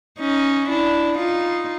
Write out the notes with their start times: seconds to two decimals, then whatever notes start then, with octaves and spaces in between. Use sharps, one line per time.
0.19 C#4 D#4
0.69 D4 E4
1.18 D#4 F4